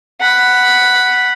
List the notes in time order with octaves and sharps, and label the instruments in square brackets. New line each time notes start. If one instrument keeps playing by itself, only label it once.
[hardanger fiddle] F#5 B5